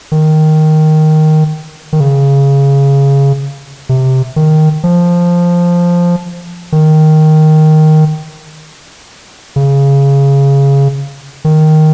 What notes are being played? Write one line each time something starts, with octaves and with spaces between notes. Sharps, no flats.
D#3
D#3
C#3
C3
D#3
F3
D#3
C#3
D#3